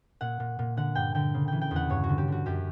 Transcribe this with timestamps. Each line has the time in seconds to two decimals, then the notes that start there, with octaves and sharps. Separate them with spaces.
0.21 A#2 F#5
0.40 A#2
0.59 A#2
0.77 D3 F#5
0.95 G2 G5
1.15 D3 G5
1.34 C#3
1.48 E3 G5
1.61 G5
1.71 E2
1.76 F#5
1.90 G2 C#5
2.04 F#4
2.09 D3
2.18 G4
2.28 D3 F#4
2.46 F#2 G4